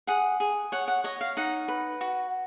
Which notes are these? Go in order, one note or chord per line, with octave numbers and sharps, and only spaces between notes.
G#4 F#5
G#4
C#5 F#5
F#5
C#5 D#5
F5
D#4 F#5
B4
F#4